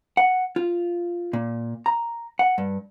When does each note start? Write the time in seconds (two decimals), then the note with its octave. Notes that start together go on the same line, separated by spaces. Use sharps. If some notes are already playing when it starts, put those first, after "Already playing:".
0.17 F#5
0.56 F4
1.33 A#2
1.86 A#5
2.39 F#5
2.58 G2